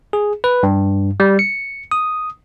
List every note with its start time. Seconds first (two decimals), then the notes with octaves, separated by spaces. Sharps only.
0.13 G#4
0.44 B4
0.63 G2
1.20 G3
1.39 C#7
1.91 D#6